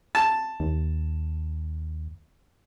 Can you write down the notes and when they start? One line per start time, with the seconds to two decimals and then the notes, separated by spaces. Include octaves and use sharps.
0.15 A5
0.60 D#2